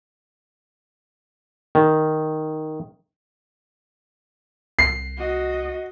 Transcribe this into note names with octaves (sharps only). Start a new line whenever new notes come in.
D#3
C2 C7
F#4 D#5